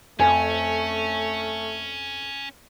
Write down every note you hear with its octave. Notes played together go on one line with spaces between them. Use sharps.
F2 A3 C#4 G#5